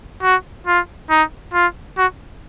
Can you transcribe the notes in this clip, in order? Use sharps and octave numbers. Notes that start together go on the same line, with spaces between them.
F#4
F4
D#4
F4
F#4